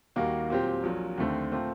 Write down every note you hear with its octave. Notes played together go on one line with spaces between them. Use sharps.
D#2 D#3 G3 A#3 F#4
A#2 F#3 C4 G4
A#1 A#2 F#3
D#2 D3 A3 C4
A#2 A3 C4